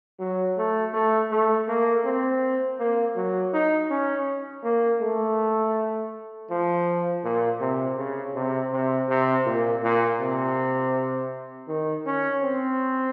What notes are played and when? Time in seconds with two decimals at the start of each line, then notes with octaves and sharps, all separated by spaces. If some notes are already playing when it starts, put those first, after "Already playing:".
0.19 F#3
0.57 A3
0.94 A3
1.31 A3
1.68 A#3
2.05 C4
2.79 A#3
3.16 F#3
3.54 D#4
3.90 C#4
4.64 A#3
5.01 A3
6.50 F3
7.24 A#2
7.61 C3
7.98 C#3
8.35 C3
8.72 C3
9.09 C3
9.46 A#2
9.83 A#2
10.20 C3
11.68 D#3
12.06 C#4
12.42 C4